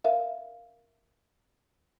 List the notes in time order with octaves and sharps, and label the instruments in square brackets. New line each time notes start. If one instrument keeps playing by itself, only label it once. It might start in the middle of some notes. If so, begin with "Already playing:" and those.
[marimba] A#4 E5 F5